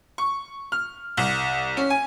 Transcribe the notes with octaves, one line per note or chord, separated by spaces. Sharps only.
C#6
F6
C2
C#4
G#5